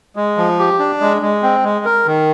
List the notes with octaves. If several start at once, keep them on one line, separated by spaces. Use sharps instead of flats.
G#3
F3
G4
D4
G#3
G#3
C4
G#3
A#4
D#3